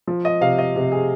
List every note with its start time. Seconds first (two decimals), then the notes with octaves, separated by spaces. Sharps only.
0.07 F3
0.25 D#5
0.41 C3 F5
0.58 D#5
0.76 C3
0.92 G#4